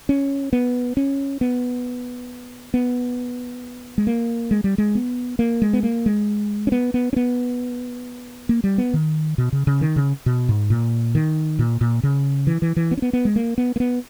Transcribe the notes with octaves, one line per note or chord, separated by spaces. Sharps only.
C#4
B3
C#4
B3
B3
G#3
A#3
G#3
G3
G#3
B3
A#3
G#3
B3
A#3
G#3
C#4
B3
B3
C#4
B3
A#3
G3
B3
D#3
B2
C#3
C#3
D#3
C#3
B2
G#2
A#2
D#3
A#2
A#2
C#3
E3
E3
E3
B3
C#4
B3
B3
G#3
A#3
B3
A#3
B3